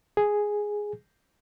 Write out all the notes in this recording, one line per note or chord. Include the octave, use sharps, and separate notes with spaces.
G#4